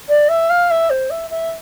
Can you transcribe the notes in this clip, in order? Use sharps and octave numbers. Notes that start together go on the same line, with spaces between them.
D5
E5
F5
E5
C5
E5
E5